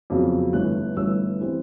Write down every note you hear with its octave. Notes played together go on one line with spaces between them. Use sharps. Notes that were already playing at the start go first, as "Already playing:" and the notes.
F2 C#3 F#3 B3
G1 G2 E3 A3 C#4 F#6
G1 G2 E3 A3 C#4 E6
E3 G3 C4